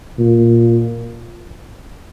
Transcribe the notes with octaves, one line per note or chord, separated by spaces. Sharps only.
A#2